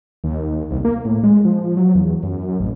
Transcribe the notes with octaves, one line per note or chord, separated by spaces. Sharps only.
D#2
C2
A#3
A2
G#3
F3
F#3
E2
F#2
A1